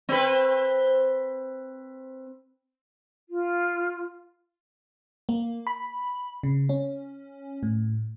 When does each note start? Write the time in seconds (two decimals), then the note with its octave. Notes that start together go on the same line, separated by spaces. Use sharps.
0.09 C4 B4
3.28 F4
5.29 A#3
5.67 B5
6.43 C#3
6.69 C#4
7.63 A2